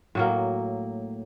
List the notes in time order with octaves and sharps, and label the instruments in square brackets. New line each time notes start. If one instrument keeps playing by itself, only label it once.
[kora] A2 F#3 A#3